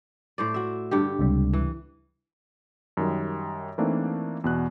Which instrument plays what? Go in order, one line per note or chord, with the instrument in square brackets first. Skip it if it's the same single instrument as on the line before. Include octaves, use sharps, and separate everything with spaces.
[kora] A2 C5 D5
F#4 E5
G2 D3 G4
[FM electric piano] C#2 C3 G3
[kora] E3
[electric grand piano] F#2 D#3 G3
E3 A3 A#3 C4 D4 D#4
E2 B2 F#6